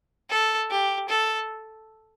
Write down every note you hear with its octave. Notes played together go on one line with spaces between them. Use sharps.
A4
G4
A4